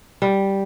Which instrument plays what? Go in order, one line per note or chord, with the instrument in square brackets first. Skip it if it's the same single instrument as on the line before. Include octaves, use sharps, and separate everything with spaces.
[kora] G3